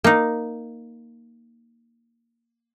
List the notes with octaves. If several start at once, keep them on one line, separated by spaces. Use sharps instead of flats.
A#3 D#4